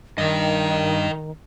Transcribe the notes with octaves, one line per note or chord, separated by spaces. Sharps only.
G2 D#3 A#4 D#5